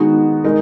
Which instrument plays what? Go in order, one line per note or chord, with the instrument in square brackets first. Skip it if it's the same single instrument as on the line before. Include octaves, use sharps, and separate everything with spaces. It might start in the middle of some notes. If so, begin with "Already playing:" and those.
Already playing: [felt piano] D#3 G#3 B3 D#4 F#4
G#3 D#4 A#4